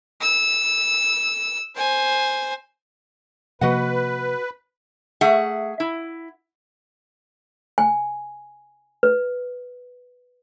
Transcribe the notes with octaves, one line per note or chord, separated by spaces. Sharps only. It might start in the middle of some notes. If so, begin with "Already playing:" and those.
E6
C5 G#5
C3 F3 A#3 F#4 B4 D#5 F#5
A3 G#4 E5 F#5
E4
G#5
B4